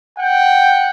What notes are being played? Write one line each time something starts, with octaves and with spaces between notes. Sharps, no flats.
F#5 G5